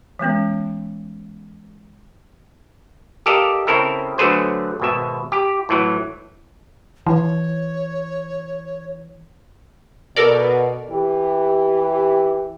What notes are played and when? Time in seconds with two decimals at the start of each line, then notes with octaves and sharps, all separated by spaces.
0.19 E3 G#3 B3 C#4
3.26 G4 A4 A#4 D5 D#5 F5
3.67 C#3 C4 E4 A4 A#4
4.18 D3 F#3 A3 G#4 B4 C5
4.80 G#1 B2 E5
5.32 G4
5.69 A2 E3 F#3
7.06 E3 C#5
10.16 B2 A4 A#4 D5
10.89 E3 G4